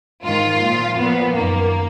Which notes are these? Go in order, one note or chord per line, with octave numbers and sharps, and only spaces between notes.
G#2 D#3 F4
A#2 F3
A#2 F3 B3
F#2 D#3 A#3